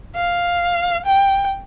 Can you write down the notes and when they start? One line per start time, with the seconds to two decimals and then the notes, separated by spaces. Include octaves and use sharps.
0.15 F5
1.06 G5